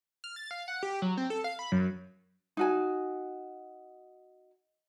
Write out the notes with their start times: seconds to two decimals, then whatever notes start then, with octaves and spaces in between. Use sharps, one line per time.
0.24 F6
0.36 A6
0.51 F5
0.68 F#5
0.83 G4
1.02 F#3
1.17 C4
1.30 A4
1.44 F5
1.59 B5
1.72 F#2
2.57 D#4 F#4 G#5